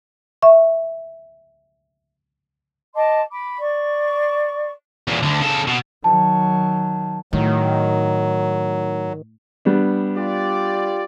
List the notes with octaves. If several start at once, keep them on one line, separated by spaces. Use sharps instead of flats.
E5 C#6
D#5 A5 C6 D6
B5 D6
D5 C#6
E2 A#2
D2 D3
C#3 A4
B2
D#3 F#3 A5
A2 D#3 F#3
G3 B3 D4
F4 G4 D5